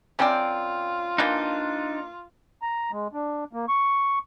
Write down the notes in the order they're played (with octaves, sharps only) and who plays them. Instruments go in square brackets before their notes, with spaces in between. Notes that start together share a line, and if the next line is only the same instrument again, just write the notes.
[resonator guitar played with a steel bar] F#2 C4 G5 [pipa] C#4 D5 [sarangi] F4
[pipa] E3 A#3 [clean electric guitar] D4 D#4
[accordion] A#5
G#3
D4
A#3
C#6